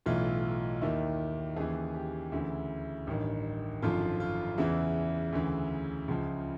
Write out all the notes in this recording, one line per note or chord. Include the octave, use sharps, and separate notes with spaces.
B1 A2 E3 F4
D#2 D#3 E4
D#2 C#3 E3 G#4
G4
D2 C#3 E3 E4
A1 G2 D#3
G#1 F#2 D3 F3 F4
F4
E2 C#3 E3 E4
D2 C#3 E3
C#2 C#3 F3